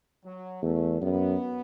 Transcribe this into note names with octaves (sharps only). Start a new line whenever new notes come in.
F#3
E2 A3
F#2 B3